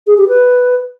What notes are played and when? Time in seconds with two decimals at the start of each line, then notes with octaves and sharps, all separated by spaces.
0.06 G#4
0.17 G4
0.28 B4